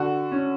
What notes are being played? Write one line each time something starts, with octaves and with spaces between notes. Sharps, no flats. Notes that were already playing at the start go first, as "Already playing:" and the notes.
Already playing: D3 F#4
C#4